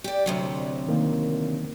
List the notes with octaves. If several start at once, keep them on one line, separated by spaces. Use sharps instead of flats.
G4 D5
D2 C3 F#3
D#3 A#3